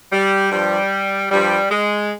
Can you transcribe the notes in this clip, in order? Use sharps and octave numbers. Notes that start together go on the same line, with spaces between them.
G3
G2 F3 G3
G2 F3 G3
G#3